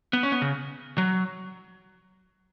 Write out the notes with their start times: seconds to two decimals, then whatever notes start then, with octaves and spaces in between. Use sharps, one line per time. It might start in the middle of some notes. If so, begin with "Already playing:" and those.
0.13 B3
0.23 C#4
0.32 B3
0.42 C#3
0.98 F#3